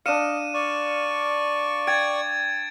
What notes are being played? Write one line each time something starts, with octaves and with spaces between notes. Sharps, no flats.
D4 D#5 F5 C#7 D#7 E7
D5 C#6
G5 G#6 A6 D7